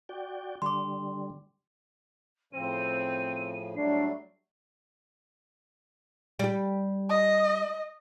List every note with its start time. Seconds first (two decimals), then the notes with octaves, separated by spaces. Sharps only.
0.09 F#4 D5 G5
0.62 D3 G3 C6 D6
2.53 A2 C#3 F3 C4 D#7
3.77 A2 F#3 G3 A3 D4 C7
6.39 G3 G4
7.09 D#5